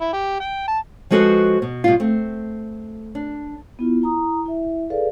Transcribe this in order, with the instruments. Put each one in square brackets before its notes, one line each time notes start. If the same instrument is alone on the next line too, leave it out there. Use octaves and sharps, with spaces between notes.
[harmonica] E4
G4
G5
A5
[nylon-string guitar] F3 G#3 F#4 A4 B4 C5
B2
B2 G3 F4
A3 C4
D4
[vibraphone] B3 E4 F4
E4 A#5 D#6
E4 E5
G#4 A4 B4 D5 F5